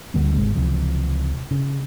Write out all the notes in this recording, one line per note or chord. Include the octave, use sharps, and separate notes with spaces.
D2 D3 G3 A#3
G#1 D#2 C3 G#3
C#2 C3 E3 F3
C#3